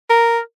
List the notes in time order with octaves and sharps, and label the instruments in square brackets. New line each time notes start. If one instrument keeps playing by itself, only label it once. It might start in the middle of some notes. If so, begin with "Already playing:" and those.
[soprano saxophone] A#4